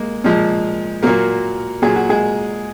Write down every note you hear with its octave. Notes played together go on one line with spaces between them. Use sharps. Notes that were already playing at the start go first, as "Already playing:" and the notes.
Already playing: G#3 A#3
A#2 F3 G#3
A#2 F#3 A#3 A#4
A#2 F#3 G#4
F#4
G#3 G#4